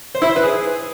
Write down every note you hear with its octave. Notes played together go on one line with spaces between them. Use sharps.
C5
E4
C5
B4
G#4